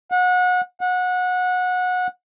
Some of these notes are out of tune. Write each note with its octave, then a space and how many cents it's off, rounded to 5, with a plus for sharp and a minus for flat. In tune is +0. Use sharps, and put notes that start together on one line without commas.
F#5 -30
F#5 -25